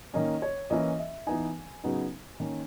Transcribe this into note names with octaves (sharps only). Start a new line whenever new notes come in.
D#3 A#3 C#4 D#5
C#5
E3 A#3 C#4 E4 D#5
E5
E3 B3 D#4 G#5
C#3 F#3 B3 D#4
D#3 A#3 C#4